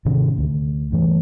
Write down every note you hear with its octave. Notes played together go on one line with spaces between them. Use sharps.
G#2 C3 D#3 C#4
D2
G2 E3 A3